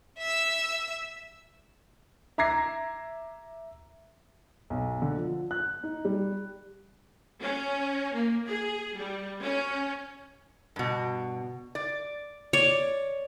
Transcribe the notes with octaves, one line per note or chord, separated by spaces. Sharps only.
E5 E6
E5 A#5 D6 G#6 A#6 C7
B1
D3
F3
F#6
D#4
G3
C#4
A#3
G#4
G3
C#4
G2 B2
D5
C#5 D5